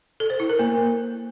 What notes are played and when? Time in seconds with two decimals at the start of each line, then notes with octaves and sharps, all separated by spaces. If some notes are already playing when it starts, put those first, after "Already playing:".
0.20 A4
0.30 C5
0.40 E4
0.49 A#4
0.59 A#3